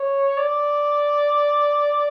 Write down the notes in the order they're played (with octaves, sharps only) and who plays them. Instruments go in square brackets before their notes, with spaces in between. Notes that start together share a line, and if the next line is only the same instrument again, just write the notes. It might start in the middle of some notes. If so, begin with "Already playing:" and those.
Already playing: [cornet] C#5
D5